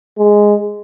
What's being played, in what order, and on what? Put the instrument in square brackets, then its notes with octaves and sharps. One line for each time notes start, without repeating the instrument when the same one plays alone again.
[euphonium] G#3